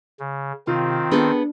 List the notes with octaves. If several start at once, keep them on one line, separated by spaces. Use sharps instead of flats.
C#3
C3 D#3 C4 F4
B3 D4 G#4 A4